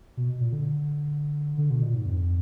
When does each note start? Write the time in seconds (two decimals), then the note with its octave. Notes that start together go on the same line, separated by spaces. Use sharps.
0.17 B2
0.40 A#2
0.53 D3
1.58 D3
1.70 B2
1.82 A#2
1.94 G#2
2.06 F2